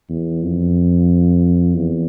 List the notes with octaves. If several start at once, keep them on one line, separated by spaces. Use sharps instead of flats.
E2
F2
E2